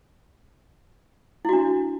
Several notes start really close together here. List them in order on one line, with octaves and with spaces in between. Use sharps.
E4 F#4 D4